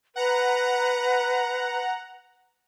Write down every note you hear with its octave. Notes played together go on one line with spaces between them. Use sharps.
B4 F#5 A#5